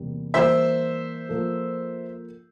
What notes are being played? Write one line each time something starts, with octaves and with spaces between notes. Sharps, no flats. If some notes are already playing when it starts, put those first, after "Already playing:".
Already playing: E2 C3 G3 A#3
E3 G3 A#3 D4 G4 C5 E5
F3 A#3 F4 A4